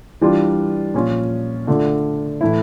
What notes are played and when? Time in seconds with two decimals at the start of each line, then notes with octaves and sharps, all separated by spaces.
0.21 E3 G3 D4 F4
0.94 A#2 F3 C#4 F4
1.67 D3 A3 D4 F4
2.41 A2 E3 A3 E4